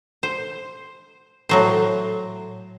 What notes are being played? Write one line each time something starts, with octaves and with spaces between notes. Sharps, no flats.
C5
A2 F#3 C5